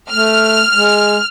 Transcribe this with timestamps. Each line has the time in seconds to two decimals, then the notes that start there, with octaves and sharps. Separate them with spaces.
0.12 A3 F6
0.71 G#3